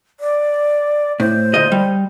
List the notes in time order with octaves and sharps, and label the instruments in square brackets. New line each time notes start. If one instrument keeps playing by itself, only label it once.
[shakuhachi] D5
[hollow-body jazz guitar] A2 [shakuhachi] C5
[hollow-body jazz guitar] D2 A#2 D#5
G3